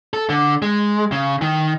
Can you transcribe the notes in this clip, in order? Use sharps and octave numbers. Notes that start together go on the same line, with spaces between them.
A4
D3
G#3
C#3
D#3